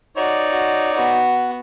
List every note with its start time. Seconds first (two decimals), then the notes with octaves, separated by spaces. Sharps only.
0.17 D#4 F#4 C#5 D5
0.50 F#4
0.93 B3 F#4